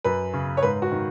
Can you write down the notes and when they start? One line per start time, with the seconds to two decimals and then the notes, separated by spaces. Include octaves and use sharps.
0.04 F#2 B4
0.34 C#3
0.57 C#5
0.62 G#2 B4
0.82 F#4
0.92 D#3